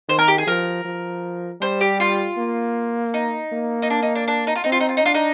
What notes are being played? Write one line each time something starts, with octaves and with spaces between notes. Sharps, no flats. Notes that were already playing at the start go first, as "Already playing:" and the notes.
D#3 C5
A#4
G4
G#4
F3 A#4
F3
G3 C5
G4
F4
A#3
D#4
A#3
D#4
D4
D#4
D4
D4
D#4
F4
C4 D#4
F4
D#4
F4
D#4
D4 F4
D#4